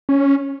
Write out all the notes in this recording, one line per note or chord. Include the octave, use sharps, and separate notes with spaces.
C#4